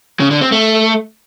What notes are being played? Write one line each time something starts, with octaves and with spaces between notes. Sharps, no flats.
C#3
D3
C4
A3